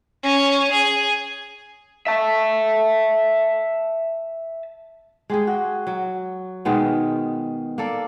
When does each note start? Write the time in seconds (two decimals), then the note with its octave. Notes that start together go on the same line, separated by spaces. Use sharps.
0.23 C#4
0.71 G#4
2.07 E5 A5
5.30 G#3 G4 G#4
5.47 F#4
5.87 F#3
6.65 B2 D#3 G#3 B3
7.78 A#3 A4 D5